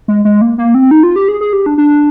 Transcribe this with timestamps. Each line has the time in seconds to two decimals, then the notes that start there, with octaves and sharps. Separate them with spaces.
0.08 G#3
0.25 G#3
0.41 A#3
0.58 A#3
0.74 C4
0.91 D#4
1.03 F4
1.16 G4
1.28 G#4
1.41 G#4
1.53 G4
1.66 D4
1.78 D4